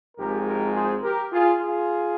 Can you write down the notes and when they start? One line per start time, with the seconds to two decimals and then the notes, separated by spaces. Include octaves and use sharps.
0.17 G#1 G#2 F3 G#3 G4 A#4
0.46 G4 A#4
0.74 G#4 C5
1.02 G4 A#4
1.31 F4 G#4
1.60 F4 G#4